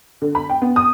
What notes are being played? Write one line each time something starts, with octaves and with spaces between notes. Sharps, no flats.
D3
B5
G5
B3
D#6